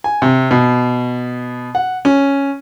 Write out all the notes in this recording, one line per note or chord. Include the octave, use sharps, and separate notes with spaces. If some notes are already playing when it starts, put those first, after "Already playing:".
G#5
C3
B2
F#5
C#4